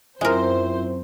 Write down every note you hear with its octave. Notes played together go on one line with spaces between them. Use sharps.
F#2 G#3 C4 E4 F4 A#4 C5 E5